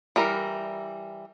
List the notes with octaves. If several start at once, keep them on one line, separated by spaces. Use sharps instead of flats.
E3 G3 A#4